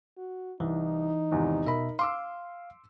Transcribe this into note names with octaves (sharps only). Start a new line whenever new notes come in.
F#4
C2 E3 D#4
G#1 E2 C3
B2 A#4 E5 B5
F5 C6 D6 E6